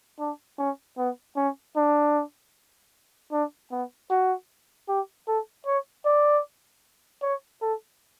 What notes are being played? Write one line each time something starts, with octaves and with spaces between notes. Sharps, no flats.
D4
C#4
B3
C#4
D4
D4
B3
F#4
G4
A4
C#5
D5
C#5
A4